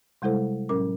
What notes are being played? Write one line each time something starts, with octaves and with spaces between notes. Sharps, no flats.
C3 G3 G#3 E4 A4 C5
A2 F#3 C#4 A#4 D6